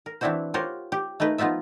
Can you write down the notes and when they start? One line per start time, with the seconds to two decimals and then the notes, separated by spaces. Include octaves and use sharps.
0.06 A#4
0.21 E3 C4 D4 E4 F#4 C5
0.54 F4 G4 A#4 C5 C#5 F#5
0.92 G4
1.20 A3 A#3 D#4 B4
1.38 F3 B3 D#4 F4 E5